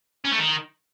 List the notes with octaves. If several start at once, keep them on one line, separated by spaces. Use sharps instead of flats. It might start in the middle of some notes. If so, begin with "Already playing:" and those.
C#4
A3
D#3